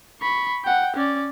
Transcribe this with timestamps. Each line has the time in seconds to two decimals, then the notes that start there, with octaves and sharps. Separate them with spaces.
0.22 B5 C#6
0.64 F#5 G5
0.96 C#4 D5